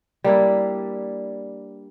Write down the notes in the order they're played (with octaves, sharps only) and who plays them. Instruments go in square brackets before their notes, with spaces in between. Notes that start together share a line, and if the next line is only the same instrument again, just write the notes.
[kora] G3 A#3 D4 E4